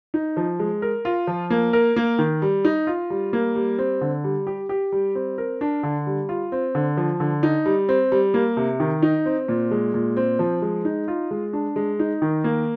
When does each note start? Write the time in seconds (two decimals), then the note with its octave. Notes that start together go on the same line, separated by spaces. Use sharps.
0.14 D#4
0.37 F3
0.59 G#3
0.82 A#4
1.05 F4
1.27 F3
1.50 A#3
1.73 A#4
1.96 A#3
2.19 D#3
2.42 G3
2.65 D#4
2.87 F4
3.10 G3
3.33 A#3
3.55 G3
3.78 C4
4.01 D3
4.24 G3
4.47 G4
4.69 G4
4.92 G3
5.15 C4
5.38 A#4
5.61 D4
5.83 D3
6.07 G3
6.29 F4
6.52 C4
6.75 D3
6.97 F3
7.20 D3
7.43 D#4
7.66 G3
7.89 C4
8.12 G3
8.34 A#3
8.57 C3
8.80 D#3
9.03 D#4
9.26 C4
9.48 A#2
9.71 G#3
9.94 A#2
10.17 C4
10.39 F3
10.62 G#3
10.85 D#4
11.08 F4
11.31 G#3
11.53 D4
11.76 G#3
11.99 D#4
12.22 D#3
12.44 A#3